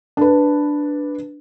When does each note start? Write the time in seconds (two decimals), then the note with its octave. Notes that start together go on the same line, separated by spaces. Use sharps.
0.17 D4 B4